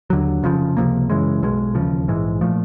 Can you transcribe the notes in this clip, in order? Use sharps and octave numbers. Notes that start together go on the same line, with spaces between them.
D#2 D3 F#3
F1 F2 C#3 F3
C#2 C3 F3 A#3
F#2 C#3 E3 G#3
B1 B2 G#3
E1 D#2 C#3 F3
A#1 G#2 E3 G#3
A#2 F3 A3